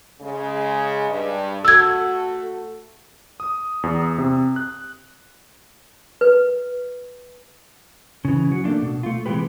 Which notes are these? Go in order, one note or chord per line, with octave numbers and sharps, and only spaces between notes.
C#3 G#3
G2
A3 F#4 A4 E6 G#6
D#6
E2
C3
F#6
B4
C#3 E3
F#3
A3 A#3 D4 F4
B2
A3 F4
C3 E3 F3 G#3 G4 B4